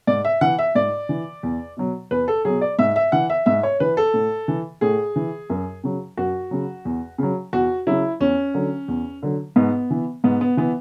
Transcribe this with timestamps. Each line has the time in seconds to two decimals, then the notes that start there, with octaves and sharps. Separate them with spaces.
0.07 G#2 D5
0.25 E5
0.41 E3 F#5
0.59 E5
0.75 G#2 D5
1.09 E3
1.43 E2
1.77 B2 F#3
2.11 E2 B4
2.28 A4
2.45 B2 F#3 G#4
2.61 D5
2.79 G#2 E5
2.96 E5
3.12 E3 F#5
3.30 E5
3.46 G#2 E5
3.63 C#5
3.80 E3 B4
3.97 A4
4.14 A2
4.48 E3
4.81 A2 G#4
5.16 E3
5.50 F#2
5.84 C#3 F#3
6.17 F#2 F#4
6.51 C#3 F#3
6.85 E2
7.18 C#3 F#3
7.53 E2 F#4
7.87 C#3 F#3 E4
8.20 E2 C#4
8.54 D3 F#3
8.88 E2
9.23 D3 F#3
9.56 G#2 B3
9.90 E3
10.24 G#2 B3
10.41 B3
10.57 E3 B3